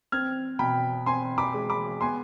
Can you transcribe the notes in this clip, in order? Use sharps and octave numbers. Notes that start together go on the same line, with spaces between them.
C4 F6 G#6
B2 G5 B5
C4 G#5 C6
B5 D6
G#3
B5 D6
B3 G#5 C6